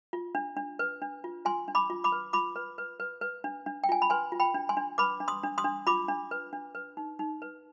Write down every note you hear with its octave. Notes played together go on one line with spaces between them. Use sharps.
F4
D4
D4
B4
D4
F4
F4 G#5 C6
D4
B5 D6
F4
B5 D6
B4
F4 B5 D6
B4
B4
B4
B4
D4
D4
G5
F4 G#5
B5
B4 G#5 C6
F4
G5 B5
D4
G#5 C6
D4
B4 B5 D6
D4
C6 D#6
D4
C6 D#6
D4
F4 B5 D6
D4
B4
D4
B4
D#4
D#4
B4